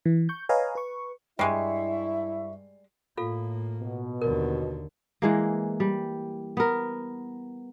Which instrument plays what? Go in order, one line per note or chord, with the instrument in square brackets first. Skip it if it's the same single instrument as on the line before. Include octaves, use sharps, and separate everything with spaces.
[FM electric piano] E3
C#6 G6
B4 C#5 D#5 F5 G#5 A#5
B4 C#6
[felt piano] G2 C#6 C7 [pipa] G3 G#3 [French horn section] E4 [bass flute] E5
[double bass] A2 A#3 [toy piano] F4 A4 F5
[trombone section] B2
[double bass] D#2 D3 [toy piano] A#4
[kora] E3 G#3 A#3
G3
B3 A#4